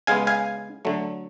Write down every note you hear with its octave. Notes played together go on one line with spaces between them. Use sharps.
C#3 G#3 B3 F5 G#5
F5 G#5
D3 F#3 A3